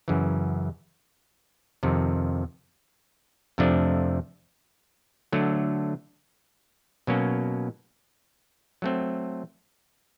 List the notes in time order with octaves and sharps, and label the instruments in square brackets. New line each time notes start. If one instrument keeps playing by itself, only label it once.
[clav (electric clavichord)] F#2 C#3 E3
F2 C3 D#3
F2 C3 F3 A3 D4
D3 F#3 A3
B2 F#3 A#3 C#4
F#3 A3 C4